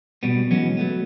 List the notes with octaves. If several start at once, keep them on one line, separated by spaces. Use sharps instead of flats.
B2 G3 B3
E3 F#3 G#3 B3 C#4 F#4
F#3 A3 B3